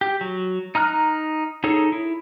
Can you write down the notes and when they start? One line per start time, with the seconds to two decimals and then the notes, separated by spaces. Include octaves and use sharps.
0.01 G4
0.21 F#3
0.75 D#4 A#5 F6 F#6
1.64 D#4 G#4 A4 C#5
1.92 E4